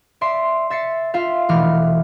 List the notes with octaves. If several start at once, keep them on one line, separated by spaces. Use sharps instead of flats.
D5 E5 C6
E5 A6 C7 C#7
F4 E5 F5
E1 E3 A3 D6 F6